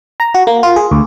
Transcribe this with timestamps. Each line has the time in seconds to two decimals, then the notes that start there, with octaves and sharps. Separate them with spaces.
0.20 A#5
0.34 F#4
0.47 A#3
0.63 F4
0.76 G#4
0.91 D2